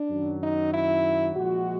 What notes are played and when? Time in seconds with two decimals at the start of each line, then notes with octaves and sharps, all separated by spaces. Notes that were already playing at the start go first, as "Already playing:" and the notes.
Already playing: D4
0.11 F#2 D#3 F#3
0.41 D#4
0.73 E4
1.36 A#2 F3 G#3 F#4